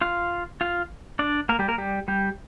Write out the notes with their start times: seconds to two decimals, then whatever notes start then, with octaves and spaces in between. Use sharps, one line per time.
0.01 F4 F5
0.61 F4 F5
1.19 D4 D5
1.49 A#3 A#4
1.59 G3 G4
1.68 A#3 A#4
1.78 G3 G4
2.08 G3 G4